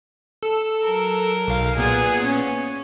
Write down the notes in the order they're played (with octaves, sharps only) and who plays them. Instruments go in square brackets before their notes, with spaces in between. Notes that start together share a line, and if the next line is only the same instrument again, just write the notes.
[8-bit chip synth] A4
[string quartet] F#3 A#4
[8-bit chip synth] B1 F5
[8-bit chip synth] A#2 B3 [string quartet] G#4
[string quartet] C#4